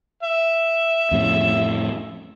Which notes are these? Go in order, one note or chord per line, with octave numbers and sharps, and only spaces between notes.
E5
F2 A2 C#3